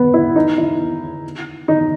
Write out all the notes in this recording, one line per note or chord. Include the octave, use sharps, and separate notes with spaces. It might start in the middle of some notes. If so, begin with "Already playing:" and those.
Already playing: B3
E4
D#4
E4
D#4